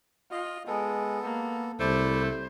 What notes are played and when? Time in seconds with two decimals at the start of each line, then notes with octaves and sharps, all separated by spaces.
0.31 F4 D#5
0.67 G#3 B3 A4
1.24 A#3
1.80 C2 A3 E4 C5 D5